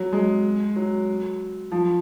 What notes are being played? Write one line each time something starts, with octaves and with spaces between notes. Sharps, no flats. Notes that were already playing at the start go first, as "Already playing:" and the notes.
Already playing: F#3
G#3
F#3
F3